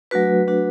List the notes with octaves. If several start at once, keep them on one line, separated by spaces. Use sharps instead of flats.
F#3 A3 D4 F#4 B4
F#3 A3 D4 F#4